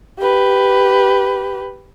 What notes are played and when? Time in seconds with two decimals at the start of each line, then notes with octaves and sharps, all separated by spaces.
0.20 G4 B4